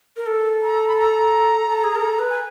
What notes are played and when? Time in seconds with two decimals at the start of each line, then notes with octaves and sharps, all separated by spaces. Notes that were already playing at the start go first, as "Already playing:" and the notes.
0.17 A#4
0.26 A4
0.62 A#5
0.88 B5
0.97 A#5
1.66 A4
1.84 G#4
1.96 A#4
2.01 A4
2.19 B4
2.30 G#5